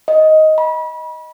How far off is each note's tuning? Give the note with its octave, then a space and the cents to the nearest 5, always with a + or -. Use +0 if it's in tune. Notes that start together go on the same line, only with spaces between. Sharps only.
D#5 +10
B5 -35